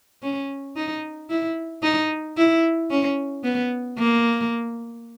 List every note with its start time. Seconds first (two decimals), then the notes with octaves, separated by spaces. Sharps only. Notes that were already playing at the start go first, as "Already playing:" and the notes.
0.22 C#4
0.76 D#4
1.30 E4
1.83 D#4
2.37 E4
2.90 C#4
3.44 B3
3.98 A#3